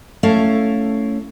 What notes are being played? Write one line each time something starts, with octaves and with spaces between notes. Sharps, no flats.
A3 C#4 E4 F5